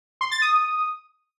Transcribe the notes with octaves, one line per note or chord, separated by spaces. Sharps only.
C6
A6
D#6